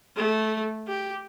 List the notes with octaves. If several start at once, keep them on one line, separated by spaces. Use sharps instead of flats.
A3
G4